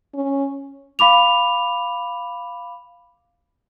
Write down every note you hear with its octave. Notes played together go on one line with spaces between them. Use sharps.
C#4
F5 B5 D6 F7